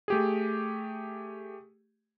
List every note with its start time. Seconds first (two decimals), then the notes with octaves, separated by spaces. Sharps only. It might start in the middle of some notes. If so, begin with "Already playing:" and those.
0.08 A3 G4 G#4